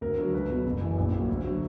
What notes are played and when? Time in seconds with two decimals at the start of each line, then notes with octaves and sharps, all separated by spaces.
0.01 D2 A#4
0.18 D3 F#3
0.33 C#2 B4
0.49 B2 F#3
0.65 F#1
0.81 F#2 E3
0.97 A#1
1.13 A#2 F#3
1.29 D2
1.44 D3 F#3